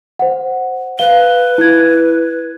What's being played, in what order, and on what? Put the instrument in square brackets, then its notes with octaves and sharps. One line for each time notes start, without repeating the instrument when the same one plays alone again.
[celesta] C5 F#5
[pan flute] B4 [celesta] F5 G7
[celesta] E4 G#6